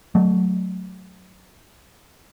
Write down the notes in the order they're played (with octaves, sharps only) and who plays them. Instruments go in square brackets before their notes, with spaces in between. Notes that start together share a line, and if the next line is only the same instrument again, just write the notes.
[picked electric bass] F#3 A3